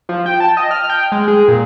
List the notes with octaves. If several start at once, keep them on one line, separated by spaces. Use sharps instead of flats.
F3
G5
A5
D#5
F6
G5
G#3
G#4
A#2